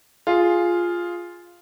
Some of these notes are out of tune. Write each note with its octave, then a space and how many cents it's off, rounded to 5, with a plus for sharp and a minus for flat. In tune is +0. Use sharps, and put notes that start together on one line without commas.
F4 +0 G#4 +0